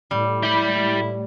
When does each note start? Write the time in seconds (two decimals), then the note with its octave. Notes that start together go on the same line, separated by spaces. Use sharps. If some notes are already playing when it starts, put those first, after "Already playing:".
0.11 A2 G3
0.43 E4 G4 B5